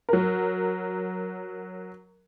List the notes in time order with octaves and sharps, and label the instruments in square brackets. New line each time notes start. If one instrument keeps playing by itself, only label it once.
[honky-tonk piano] F#3 A#4